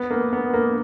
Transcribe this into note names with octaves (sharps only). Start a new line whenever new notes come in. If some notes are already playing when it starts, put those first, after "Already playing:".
Already playing: B3
A#3
B3
A#3